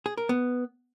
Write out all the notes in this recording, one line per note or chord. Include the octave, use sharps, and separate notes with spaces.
G#4
A#4
B3